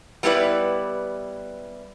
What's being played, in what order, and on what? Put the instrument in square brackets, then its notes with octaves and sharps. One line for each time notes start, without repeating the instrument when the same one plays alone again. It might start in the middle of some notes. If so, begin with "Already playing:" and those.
[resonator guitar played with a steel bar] G3 B3 E4 F4 B4 D5